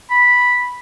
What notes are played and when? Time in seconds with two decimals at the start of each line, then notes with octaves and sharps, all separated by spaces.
0.10 B5